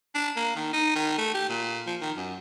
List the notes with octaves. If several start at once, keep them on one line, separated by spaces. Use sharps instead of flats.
D4
A#3
D#3
D#4
D#3
A3
G4
A#2
F3
D#3
F#2